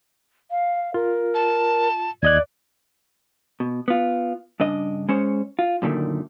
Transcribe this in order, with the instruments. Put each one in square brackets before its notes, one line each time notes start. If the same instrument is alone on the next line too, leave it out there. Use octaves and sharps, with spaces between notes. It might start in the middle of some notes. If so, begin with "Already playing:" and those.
[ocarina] F5
[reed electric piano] F4 [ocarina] A#4
[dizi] A5
[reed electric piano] D#2 D#5 F#6 [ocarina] D5 [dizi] G#6
[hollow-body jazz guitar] B2
B3 F4
G2 C#3 D4 D#5
G#3 C#4 C5 C#5
F4
F#2 A#2 D3 D#3 A3